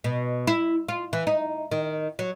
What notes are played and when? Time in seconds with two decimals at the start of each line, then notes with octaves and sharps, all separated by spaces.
0.04 B2
0.47 E4
0.88 F4
1.13 E3
1.27 D#4
1.71 D#3
2.19 F#3